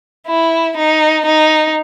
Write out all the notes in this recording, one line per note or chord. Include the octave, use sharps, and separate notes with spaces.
E4
D#4
D#4